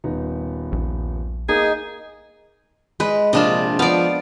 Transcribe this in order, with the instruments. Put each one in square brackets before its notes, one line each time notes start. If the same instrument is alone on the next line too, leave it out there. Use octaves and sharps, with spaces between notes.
[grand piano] D#1 B3 D#4
[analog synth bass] A#1
[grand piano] A#3 [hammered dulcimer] D#4 [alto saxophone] G#4
[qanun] G#3 [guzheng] B4
[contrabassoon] A#1 [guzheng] C3 D4 F4 [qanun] D#5
[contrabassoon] F3 [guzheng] B3 [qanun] D5 F5